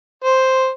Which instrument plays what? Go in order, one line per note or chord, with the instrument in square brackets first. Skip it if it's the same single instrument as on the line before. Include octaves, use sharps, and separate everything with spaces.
[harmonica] C5